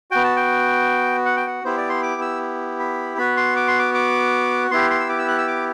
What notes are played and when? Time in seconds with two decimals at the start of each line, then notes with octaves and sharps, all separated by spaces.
0.11 B3 F#4 G5
0.24 A5
0.36 G5
1.26 F#5
1.36 G5
1.47 F#5
1.64 B3 E4 G4 C5
1.77 D5
1.89 C6
2.03 D6
2.21 E6
2.80 B5
3.18 B3 F#4 B5
3.37 C6
3.56 D6
3.67 C6
3.79 D6
3.94 D6
4.71 B3 E4 G4 C6
4.90 C6
5.00 E6
5.09 D6
5.19 E6
5.28 F#6
5.38 E6
5.47 D6